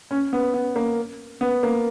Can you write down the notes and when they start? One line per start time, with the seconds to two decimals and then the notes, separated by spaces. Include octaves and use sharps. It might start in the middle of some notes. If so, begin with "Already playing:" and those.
0.11 C#4
0.33 B3
0.54 B3
0.76 A#3
1.41 B3
1.63 A#3